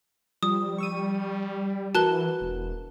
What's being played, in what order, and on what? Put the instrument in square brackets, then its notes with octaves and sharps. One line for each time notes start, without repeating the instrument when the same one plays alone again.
[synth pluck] F3 [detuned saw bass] G3 [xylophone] D#6
[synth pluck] C#6 E6 D#7
[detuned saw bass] E3 [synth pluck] F#4 A#4 B4 [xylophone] A5 F#6 G7
[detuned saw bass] E1